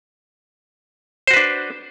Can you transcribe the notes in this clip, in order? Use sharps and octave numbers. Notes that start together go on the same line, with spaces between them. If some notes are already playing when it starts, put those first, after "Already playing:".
D4 F#4 B4 C5